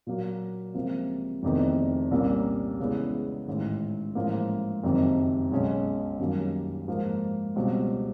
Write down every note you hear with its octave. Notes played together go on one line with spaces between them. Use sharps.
A#2 F#3 A#3
C#2 C3 F3 A#3
F1 E2 C3 D#3
C2 A#2 G3 A#3 C#4
E2 C#3 E3 G#3 B3
A1 G#2 D#3
A1 G#2 F3 A#3
F#1 F2 C3 D#3
B1 B2 G#3 C#4
F#2 D#3 G3 A#3 C#4
G#2 F3 A#3
C#2 B2 G3 C4